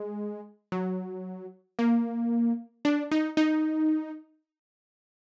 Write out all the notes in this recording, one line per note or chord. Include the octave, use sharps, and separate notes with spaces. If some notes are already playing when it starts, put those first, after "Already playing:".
Already playing: G#3
F#3
A#3
D4
D#4
D#4